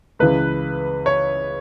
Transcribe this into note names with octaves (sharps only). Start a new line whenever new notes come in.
C#2 C#3 E3 B4
C#5